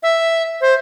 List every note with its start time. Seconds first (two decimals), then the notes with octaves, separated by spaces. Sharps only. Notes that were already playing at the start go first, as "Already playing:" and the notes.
0.03 E5
0.61 C5